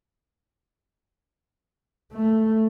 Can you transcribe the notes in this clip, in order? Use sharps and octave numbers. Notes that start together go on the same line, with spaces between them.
A3